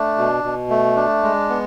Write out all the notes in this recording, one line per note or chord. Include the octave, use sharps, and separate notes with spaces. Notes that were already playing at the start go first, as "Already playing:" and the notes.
Already playing: A3 D4
B2
B2
A3
D4
G#3
B3